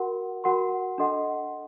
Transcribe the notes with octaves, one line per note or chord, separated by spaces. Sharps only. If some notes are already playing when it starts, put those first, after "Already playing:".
Already playing: F#4 A#4 F#5 C6
F#4 A#4 F#5 C6
D4 A4 D#5 F#5 C6